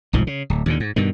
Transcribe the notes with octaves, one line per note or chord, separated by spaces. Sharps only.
E1 C2 G#2 F3
C#3
D1
D#2 A#2 D3
G#2
G2 B2 D#3